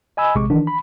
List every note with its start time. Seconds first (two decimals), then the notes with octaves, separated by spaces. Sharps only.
0.17 D#5 G#5 B5 E6
0.35 A#1 C3 G#3 C#6 D6
0.50 D#3 E3 D4
0.67 B5